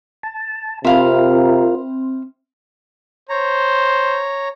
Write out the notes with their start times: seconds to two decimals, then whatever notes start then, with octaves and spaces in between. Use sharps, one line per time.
0.23 A5
0.85 C3 C4 F4 A#4 E5 F5 B5
3.29 C5 C#5 A#5